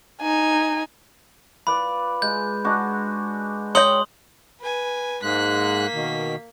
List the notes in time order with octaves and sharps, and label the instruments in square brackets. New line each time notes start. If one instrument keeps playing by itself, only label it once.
[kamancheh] D#4 G#5
[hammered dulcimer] F4 B4 D5 [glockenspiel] B5
[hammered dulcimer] G#3 [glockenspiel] G6
[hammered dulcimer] G#3 D4 F#4
[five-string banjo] C#5 D#5 G5 [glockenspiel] C6 D#6 F#7
[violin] B4 G#5
[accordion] G#2 G#3 F#6 [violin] A#3 B6
[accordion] B2 D#3